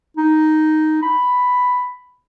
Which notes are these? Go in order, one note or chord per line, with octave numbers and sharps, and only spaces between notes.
D#4
B5